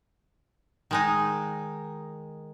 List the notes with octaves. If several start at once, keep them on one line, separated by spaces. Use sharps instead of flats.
D#3 G#3 D#4